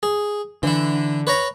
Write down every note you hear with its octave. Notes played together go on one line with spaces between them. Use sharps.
G#4
D3 E3 E4
B4 C#5 A#5